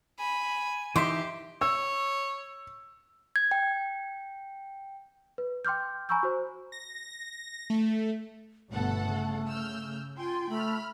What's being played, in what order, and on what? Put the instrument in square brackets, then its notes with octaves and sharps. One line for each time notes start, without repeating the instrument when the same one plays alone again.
[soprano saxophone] G#5 [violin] B5
[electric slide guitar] E3 D#4 E5 [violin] G4 [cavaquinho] C6 D6
[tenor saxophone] C#5 [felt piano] E6
[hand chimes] G#6
G5
[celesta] B4
G5 C6 D6 F6 G6
G#5 A#5 B5 C#6 E6 G6
F#4 C5
[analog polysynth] A#6
A3
[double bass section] G1 B2 B3 [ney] A3 [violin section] A4 F#5
[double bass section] C#3
[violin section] E6 F6 G6
[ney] F4 [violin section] G5 G#5 C6
[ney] A3 [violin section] B5 F6